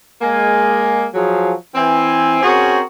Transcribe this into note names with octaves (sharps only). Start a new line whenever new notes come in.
G#3 A#3 G#5
F3 F#3 G#4
E3 C4 G#5
C4 C#4 F#4 G#4 A#4 C5